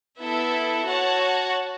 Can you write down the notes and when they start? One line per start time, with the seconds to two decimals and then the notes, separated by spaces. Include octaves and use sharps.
0.20 B3 E4 A4 E5
0.88 F#4 C#5 F#5 A5